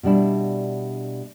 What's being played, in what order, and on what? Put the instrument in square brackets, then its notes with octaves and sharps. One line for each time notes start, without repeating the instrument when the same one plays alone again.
[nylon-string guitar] B2 G3 D4 E4